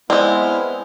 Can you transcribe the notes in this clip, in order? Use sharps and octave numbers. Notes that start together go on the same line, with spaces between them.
G#3 B3 C4 E4 D5 F6